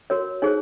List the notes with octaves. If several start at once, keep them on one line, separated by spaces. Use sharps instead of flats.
F#4 A#4 C#5
D#4 G#4 C5 C#5